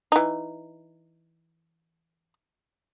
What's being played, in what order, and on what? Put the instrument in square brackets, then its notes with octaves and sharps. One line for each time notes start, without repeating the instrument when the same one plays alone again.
[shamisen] E3 D#4